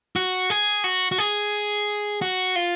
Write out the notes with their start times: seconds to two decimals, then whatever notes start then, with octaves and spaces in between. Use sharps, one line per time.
0.16 F#4
0.50 G#4
0.84 F#4
1.12 F#4
1.18 G#4
2.22 F#4
2.56 F4